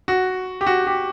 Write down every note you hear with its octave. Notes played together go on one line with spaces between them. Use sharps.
F#4
G4
F#4
G4